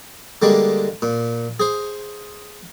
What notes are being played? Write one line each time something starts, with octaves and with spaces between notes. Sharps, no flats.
D3 G3 G#3 A#3 D4
A#2
G#4 C5